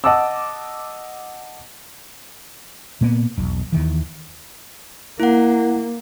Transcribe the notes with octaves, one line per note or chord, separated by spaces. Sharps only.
D#5 F#5 A5 D6 E6
A#2 A#3 B3
E1 B1
D#2 D#3 E3
A#3 E4 F#5